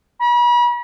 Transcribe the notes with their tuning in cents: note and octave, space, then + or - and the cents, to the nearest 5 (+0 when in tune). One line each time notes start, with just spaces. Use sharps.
B5 -40